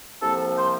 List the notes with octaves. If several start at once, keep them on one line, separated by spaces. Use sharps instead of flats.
C2 C3 F3 A#3 A4
C5